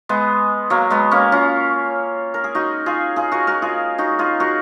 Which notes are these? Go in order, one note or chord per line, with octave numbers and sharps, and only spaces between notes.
G#3 B3
F#3 A#3
G#3 B3
A#3 C#4
C#4 F4
A#4
G#4
D#4 F#4
F4 G#4
F4 G#4
F#4 A#4
F#4 A#4
F4 G#4
D#4 F#4
F4 G#4
F#4 A#4